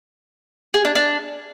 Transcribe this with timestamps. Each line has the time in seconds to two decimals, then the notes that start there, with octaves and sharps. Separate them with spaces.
0.74 G#4
0.85 D4
0.95 D4